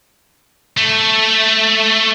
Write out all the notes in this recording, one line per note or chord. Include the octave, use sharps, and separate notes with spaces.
A3